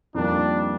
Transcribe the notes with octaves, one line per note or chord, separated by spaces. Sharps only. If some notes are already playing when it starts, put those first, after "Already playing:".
F2 D#3 G3 A#3 D4